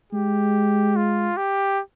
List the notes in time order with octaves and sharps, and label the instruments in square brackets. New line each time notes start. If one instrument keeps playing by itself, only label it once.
[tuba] G#3 [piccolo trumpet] G4
[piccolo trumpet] F4
G4